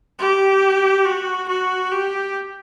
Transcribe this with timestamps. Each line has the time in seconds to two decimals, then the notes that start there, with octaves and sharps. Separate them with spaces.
0.19 G4
1.05 F#4
1.48 F#4
1.92 G4